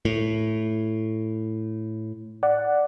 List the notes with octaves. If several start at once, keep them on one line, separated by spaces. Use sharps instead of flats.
A2
D5 F#5